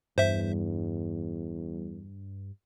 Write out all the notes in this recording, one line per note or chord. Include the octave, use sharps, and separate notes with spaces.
E2 G2 C5 E5